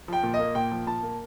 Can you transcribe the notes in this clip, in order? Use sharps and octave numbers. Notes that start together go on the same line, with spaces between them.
F3 G5
A#2
D#5
A#3
A#2 G5
F3
A#2 A5
A#3